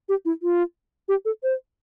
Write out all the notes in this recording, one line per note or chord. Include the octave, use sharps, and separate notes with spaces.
G4
E4
F4
G4
A4
C5